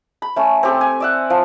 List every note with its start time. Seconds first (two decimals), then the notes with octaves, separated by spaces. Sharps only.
0.22 B5
0.36 A3 C#4
0.63 C4 G4 A4
0.81 G#5
1.00 D5 E5 F#5
1.30 F3